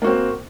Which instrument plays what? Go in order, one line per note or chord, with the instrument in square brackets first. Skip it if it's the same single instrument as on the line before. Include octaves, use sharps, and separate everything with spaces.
[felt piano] A#3
F#4
C4